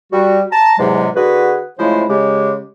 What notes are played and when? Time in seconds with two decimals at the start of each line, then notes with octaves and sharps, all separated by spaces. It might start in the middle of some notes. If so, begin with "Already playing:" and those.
0.12 G3 F#4
0.52 A5 A#5
0.78 E2 G#2 C3 F#3 G#3
1.16 D3 F#4 G#4 B4
1.79 C#3 F3 G#3 A3 E4 C5
2.09 C#3 G#3 G4